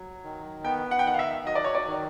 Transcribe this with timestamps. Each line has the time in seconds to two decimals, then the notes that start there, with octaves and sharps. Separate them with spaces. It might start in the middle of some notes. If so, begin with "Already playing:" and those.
Already playing: F#3
0.24 D#3
0.64 B3 G5
0.91 F#5
0.99 G5
1.05 D#3 F#5
1.14 F5
1.19 E5
1.46 F#3 D#5
1.55 D5
1.64 C#5
1.75 D5
1.87 D#3